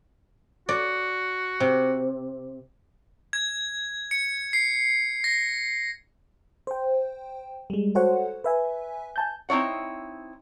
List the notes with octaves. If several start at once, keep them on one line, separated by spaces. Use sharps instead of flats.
F#4 D5
C3
G#6
C#7
C7
A#6
C5 G5
G3 G#3
F#4 A4 C5 C#5 F#5
B4 E5 G#5
G#5 A5 G6
C4 D#4 E4 C#5 F#5